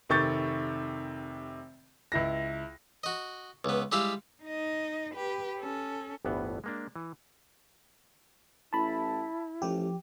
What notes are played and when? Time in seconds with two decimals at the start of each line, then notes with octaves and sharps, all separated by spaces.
0.09 F1 C3 D#3 C#6 G6 A6
2.12 C#2 E4 A#6
3.03 F#4 D#5
3.65 C#2 B3
3.92 G3 G#3 E4 G4 E5 F5
4.43 D#4 D#5
5.15 G4 B4
5.59 C#4 A4
6.25 G1 D2 A2 E3 B3
6.64 G#3 A#3 D4
6.96 E3
8.73 A1 E4 A5 B5
9.62 A1 F3 G4